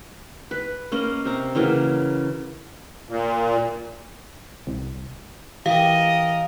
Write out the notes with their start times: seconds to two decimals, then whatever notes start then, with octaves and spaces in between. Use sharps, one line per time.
0.51 B4
0.92 A#3 C#4 D#5
1.25 C3 A#5
1.55 C#3 E3 F#3 A#3
3.09 A#2
4.67 C2
5.66 E3 G4 A#4 D#5 F5